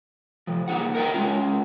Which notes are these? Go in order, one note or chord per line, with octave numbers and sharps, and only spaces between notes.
C3 F3
A#3 D#4 G#4 F#5
A#4 D#5 E5 F#5 G5
G#3 C#4 F4